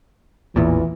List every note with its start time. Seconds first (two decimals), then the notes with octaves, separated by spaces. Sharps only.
0.56 A1 E2 A#2 E3